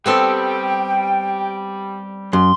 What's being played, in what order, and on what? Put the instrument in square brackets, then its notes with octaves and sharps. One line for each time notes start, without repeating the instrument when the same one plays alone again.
[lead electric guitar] G3 G4 [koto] B3 C4 A4 [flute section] G5
[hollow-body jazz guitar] F#2 [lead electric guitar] C6